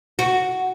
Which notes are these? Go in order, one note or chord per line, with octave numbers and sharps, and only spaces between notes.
F#4